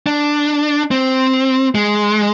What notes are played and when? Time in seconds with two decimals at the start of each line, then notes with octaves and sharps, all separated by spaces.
0.07 D4
0.91 C4
1.75 G#3